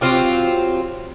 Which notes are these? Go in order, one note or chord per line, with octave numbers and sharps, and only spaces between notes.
F#3 C4 F4 G4